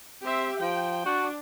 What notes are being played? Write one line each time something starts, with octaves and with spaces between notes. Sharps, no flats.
C4 G4 E5
F3 G5
D4 F#4